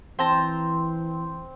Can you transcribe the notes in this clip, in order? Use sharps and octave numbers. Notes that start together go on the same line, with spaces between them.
E3 C4 G5 A5 A#5